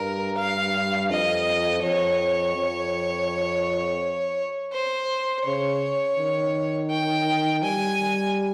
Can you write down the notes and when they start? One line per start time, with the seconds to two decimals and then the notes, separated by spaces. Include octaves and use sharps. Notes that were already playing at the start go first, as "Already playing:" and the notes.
Already playing: G2 A#4
0.37 F5
1.10 F2 D#5
1.83 F2 C#5
2.55 F2
4.73 C5
5.45 C#3 C#5
6.18 D#3
6.90 G5
7.63 G3 G#5